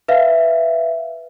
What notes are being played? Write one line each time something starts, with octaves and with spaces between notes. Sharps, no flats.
B4 E5 F5